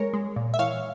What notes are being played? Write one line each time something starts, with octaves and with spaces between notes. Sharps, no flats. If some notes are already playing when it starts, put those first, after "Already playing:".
Already playing: G#3 A#4 C#5
G#3
A#2
E5
E3 C#5 F5